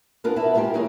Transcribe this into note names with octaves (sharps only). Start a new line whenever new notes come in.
B3 D4 F4 G#4 A#4
B2 B3 E4 E5 A5
G#3 A#3 F4 G4 A#4
E3 A#3 D#4 G#4 C#5